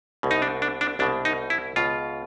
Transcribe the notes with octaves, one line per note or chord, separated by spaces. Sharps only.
C2 B2
D#4
D4
D4
D4
C2 B2 D4
D#4
E4
C#2 B2 F4